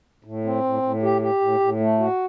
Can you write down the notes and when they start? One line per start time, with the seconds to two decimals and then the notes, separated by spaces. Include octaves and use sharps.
0.24 A2
0.44 C4
0.64 A2
0.82 A2
1.02 G4
1.22 G4
1.41 A2
1.60 A2
1.80 A3
1.99 F#4